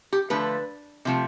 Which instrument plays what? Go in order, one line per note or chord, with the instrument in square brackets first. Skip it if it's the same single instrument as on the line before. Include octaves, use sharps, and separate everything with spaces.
[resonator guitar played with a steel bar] G4
D3 F3 A3 B4
C3 F3 A3